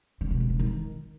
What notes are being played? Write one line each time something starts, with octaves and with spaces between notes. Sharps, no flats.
D3
B2
D3
C3
D#3